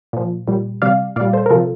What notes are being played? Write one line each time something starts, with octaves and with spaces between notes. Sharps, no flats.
A#2 F3
A#2 G3
C3 G3 D5 F5
A#2 G3 D5 F5
A4 C5
A#4
C3 F3 F4 A4